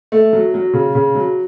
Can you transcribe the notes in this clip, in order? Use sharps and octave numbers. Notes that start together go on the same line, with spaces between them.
A3
F#3
F#3
C#3
C#3
F#3